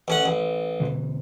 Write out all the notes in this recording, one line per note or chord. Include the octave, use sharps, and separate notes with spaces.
A1 C#4 F#5
A1
B2 D3 E3